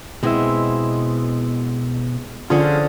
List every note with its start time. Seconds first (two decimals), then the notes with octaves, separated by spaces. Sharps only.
0.23 B2 G#3 B3 C4 E4 E5
2.50 D3 F3 C#4 F4 G#4 F#5